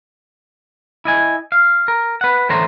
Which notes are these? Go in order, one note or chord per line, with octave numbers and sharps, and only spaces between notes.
E4 D#5 G#5
F5
A#4
B4 F#5
A2 D3 E3 A3 C5 A#5